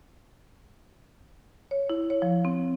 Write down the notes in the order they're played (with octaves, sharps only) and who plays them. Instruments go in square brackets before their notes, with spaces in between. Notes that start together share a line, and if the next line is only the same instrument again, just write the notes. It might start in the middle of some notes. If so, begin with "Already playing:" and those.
[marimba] C#5
E4
C#5
F3
C4